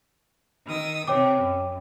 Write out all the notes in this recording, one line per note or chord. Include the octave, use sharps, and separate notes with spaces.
D#3 D#6 E6
C3 C#5 G5 D6
F#2